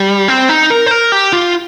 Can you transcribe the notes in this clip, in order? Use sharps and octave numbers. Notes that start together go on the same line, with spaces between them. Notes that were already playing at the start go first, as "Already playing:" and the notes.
Already playing: G3
C4
D#4
A#4
C5
A#4
G4
F4